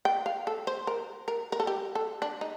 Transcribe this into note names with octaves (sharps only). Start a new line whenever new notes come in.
G5
F5
A4
C5
A#4
A#4
A#4
A4
G4
A4
D4
D#4